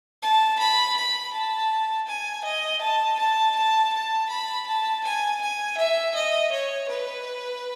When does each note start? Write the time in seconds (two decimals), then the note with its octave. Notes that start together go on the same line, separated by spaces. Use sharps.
0.22 A5
0.59 B5
0.97 B5
1.34 A5
2.08 G#5
2.45 D#5
2.82 A5
3.19 A5
3.56 A5
3.93 A5
4.30 B5
4.67 A5
5.04 G#5
5.41 G#5
5.78 E5
6.15 D#5
6.52 C#5
6.89 B4